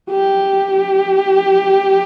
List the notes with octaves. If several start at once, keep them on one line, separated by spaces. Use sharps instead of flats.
G4